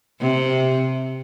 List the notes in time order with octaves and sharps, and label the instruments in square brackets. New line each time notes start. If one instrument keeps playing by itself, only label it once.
[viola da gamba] C3